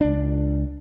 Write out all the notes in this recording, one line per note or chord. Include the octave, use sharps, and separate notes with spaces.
C#2 D4